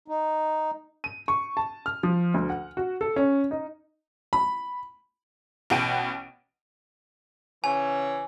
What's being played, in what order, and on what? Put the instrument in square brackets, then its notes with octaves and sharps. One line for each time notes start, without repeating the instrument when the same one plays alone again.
[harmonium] D#4
[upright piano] D#7
C#6
A5
F6
F3
D2
F#5
F#4
A4
C#4
D#4
[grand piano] B5
[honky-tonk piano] A1 B2 F#5 G5 D7 D#7
[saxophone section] C#3 E3 C#5 [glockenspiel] G#5